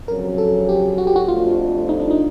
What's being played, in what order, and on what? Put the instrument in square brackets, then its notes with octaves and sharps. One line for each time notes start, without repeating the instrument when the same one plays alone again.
[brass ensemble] F2 C#3 F#3 [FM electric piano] A#4
[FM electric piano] A4
G4
F#4
G4
F#4
[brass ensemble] G1 F2 D3 F3 A3 [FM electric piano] F4
[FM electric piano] D#4
D4
D#4